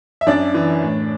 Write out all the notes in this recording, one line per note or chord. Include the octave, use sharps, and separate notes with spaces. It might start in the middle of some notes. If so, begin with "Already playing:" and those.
E5
F#2 D4 D5
E3
A2